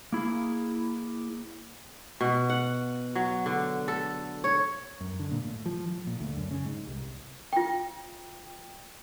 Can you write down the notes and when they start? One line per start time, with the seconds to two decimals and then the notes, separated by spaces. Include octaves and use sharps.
0.12 A#3 E4 G#4
2.21 B2
2.49 F#5
3.15 F#3
3.46 D3
3.88 A4
4.44 C#5
5.00 F#2
5.19 D3
5.31 A#2
5.44 A2
5.66 F3
5.90 F3
6.07 A#2
6.20 D2
6.37 F#2
6.51 C#3
6.65 G#2
6.87 C2
7.53 F4 G5